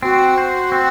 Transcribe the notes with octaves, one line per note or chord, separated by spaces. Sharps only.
C4 F#4
C5
C4